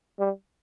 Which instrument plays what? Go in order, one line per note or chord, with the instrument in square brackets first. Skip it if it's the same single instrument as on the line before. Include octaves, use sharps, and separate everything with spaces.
[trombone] G3